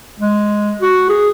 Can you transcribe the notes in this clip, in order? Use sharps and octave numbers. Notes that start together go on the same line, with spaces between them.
G#3
F#4
G#4